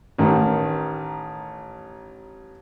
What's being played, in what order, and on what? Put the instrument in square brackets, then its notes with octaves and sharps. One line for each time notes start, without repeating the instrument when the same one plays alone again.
[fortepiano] A1 D#3